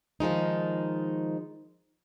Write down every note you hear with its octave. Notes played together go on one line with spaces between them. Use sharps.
D#3 F3 G#3 D#4